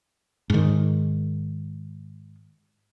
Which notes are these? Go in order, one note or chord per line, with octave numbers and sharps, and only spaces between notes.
G#2 D#3